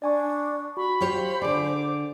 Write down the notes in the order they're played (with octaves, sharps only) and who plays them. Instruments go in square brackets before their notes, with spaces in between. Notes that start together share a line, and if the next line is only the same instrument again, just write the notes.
[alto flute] D4 [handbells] D5 G#5 C#6
[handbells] F#4 [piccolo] B5 [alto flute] C#6
[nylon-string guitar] F4 G4 C#5 [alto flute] C5
[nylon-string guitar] D3 G#4 [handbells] D5 [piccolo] D6